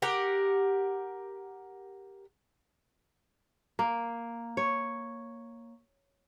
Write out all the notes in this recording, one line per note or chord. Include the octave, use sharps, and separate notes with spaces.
G4 A#4 F#5
A#3
C#5